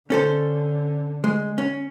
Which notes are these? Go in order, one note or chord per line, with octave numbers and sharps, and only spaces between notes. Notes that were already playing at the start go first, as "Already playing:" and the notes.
D3 C#4 A4 C5
G#3
C#4